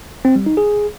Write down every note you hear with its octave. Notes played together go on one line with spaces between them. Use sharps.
C4
G3
D#4
G#4